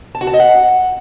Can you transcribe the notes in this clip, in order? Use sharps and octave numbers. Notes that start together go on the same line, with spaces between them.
A5
F#4
A5
D#5
F#5